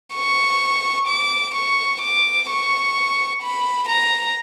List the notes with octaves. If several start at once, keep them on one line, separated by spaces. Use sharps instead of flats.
C#6
D6
C#6
D6
C#6
B5
A#5